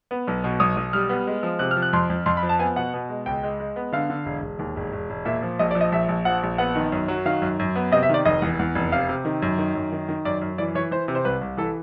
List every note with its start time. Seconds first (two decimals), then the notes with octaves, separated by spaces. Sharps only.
0.11 B3
0.27 B1
0.44 B2
0.60 B1 D#6
0.77 B1
0.93 G3 F6
1.09 B3
1.27 G#3
1.43 F3
1.59 C3 F#6
1.71 F6
1.77 F3
1.82 F#6
1.93 F2 C6
2.10 F2
2.26 F2 C6
2.37 B5
2.43 F3
2.49 A5
2.59 B3 G#5
2.76 B2 F#5
2.94 B2
3.09 G#3
3.26 C#2 G5
3.43 G#3
3.60 G#3
3.76 B3
3.92 D3 F5
4.10 D3
4.26 E1
4.42 E1
4.59 D#2
4.77 E1
4.93 E1
5.10 E1
5.25 A#2 E5
5.43 F3
5.59 A#1 D#5
5.71 D5
5.75 F3
5.81 D#5
5.92 A#1 E5
6.08 A#1
6.25 F3 F#5
6.43 A#1
6.58 B3 F#5
6.75 D#3
6.92 F#2
7.08 F#3
7.26 D#3 F5
7.42 F#2
7.59 F#2
7.75 B3
7.92 C3 D#5
8.03 E5
8.09 D#3 D5
8.25 F1 D#5
8.42 E2
8.59 E2
8.75 F1
8.92 C3 F5
9.09 C3
9.25 D#3
9.42 F#2
9.58 D#3
9.75 F#2
9.92 D#3
10.09 D#3
10.25 F#2 D5
10.41 F#2
10.58 E3 D5
10.75 E3 C#5
10.91 E3 C5
11.08 C3
11.15 C5
11.25 C2 B4
11.41 C2
11.57 E3 A4